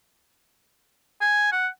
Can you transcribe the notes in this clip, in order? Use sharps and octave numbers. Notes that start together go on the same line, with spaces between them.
G#5
F#5